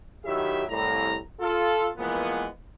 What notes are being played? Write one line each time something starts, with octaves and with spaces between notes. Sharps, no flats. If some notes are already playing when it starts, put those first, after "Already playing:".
D#3 F#3 E4 G4 E5
C2 A2 A#5
F4 A4
E3 F3 G#3 A#3 B3